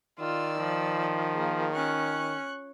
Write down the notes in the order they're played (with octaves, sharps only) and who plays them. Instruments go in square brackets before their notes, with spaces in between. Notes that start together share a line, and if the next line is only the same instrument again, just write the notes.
[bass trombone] D#3 [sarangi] F4 [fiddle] D5 E6
[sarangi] F3
[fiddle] A#3 G#4
[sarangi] C#4 [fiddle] C#6 F#6